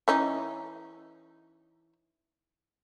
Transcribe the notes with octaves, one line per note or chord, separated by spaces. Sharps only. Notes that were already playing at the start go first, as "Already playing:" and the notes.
E3 C#4 D#4